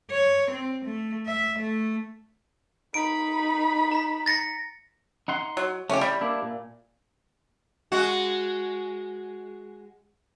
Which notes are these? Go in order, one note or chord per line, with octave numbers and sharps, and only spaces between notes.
C#5
C4
A3
E5
A3
D#4 B5 D7
A#5 B6
A6 A#6 C#7
D#4 F#5 C6
F#3
C#3 F3 A3 C#4 G4
G3 B5
A#3 D4 E4
A#2
G#3 F#4